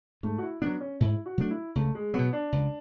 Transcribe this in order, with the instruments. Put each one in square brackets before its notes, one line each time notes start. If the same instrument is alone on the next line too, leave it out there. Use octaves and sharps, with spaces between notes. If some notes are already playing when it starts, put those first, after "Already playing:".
[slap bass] G#2 [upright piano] A3
[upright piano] F#4
E4
[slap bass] F#3 A3 D4 [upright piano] B3
[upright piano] C#4
[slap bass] G#2 [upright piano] E4
[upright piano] F#4
[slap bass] F#3 A3 D4
[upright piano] E4
[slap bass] C#2 [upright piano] A3
[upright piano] G#3
[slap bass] B2 F#3 [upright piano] B3
[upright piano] D4
[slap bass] C#2